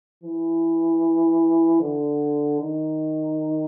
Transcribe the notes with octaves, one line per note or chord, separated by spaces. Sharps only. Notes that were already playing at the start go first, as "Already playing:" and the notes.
E3
D3
D#3